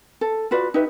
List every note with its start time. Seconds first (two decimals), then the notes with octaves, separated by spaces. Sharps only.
0.21 A4
0.51 F4 F#4 B4 D5
0.74 D#4 G4 B4 E5